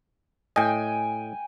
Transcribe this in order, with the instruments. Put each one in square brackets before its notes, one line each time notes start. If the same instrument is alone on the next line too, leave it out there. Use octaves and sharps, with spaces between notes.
[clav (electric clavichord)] A2 D#5 [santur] G5 G#5